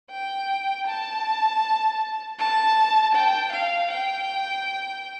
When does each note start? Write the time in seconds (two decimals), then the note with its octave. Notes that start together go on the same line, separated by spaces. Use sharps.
0.11 G5
0.87 A5
2.39 A5
3.15 G5
3.53 F5
3.91 G5